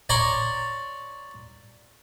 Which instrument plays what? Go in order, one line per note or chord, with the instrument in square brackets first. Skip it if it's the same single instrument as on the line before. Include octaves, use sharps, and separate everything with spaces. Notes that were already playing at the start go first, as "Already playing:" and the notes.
[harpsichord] C#5 D5 A#5 C6